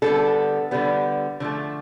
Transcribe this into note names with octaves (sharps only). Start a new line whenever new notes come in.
D3 G3 B3 A4
D3 G3 B3
D3 F3 A3